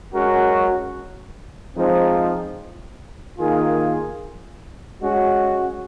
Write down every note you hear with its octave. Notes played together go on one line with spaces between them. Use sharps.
G#3 C#4 F#4 A#4
F3 G#3 C4 D#4
D#3 A#3 F4 G#4
G#3 C#4 F#4